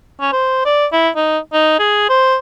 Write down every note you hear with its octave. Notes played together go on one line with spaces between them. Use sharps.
C#4
C5
D5
E4
D#4
D#4
G#4
C5